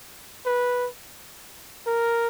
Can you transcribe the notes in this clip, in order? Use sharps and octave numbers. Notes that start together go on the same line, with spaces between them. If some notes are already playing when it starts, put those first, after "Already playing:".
B4
A#4